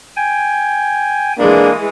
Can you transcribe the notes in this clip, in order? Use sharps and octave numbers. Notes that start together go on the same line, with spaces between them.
G5 G#5
E3 G#3 A#3 D4